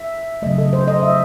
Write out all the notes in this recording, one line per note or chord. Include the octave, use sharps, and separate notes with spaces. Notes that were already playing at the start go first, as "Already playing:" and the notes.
Already playing: E5
C#3 F#3 A3 D#5
A4
C5
D#5
E5